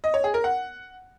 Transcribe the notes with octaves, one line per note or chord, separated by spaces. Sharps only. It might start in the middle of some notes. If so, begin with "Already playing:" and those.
D#5
C#5
G#4
A#4
F#5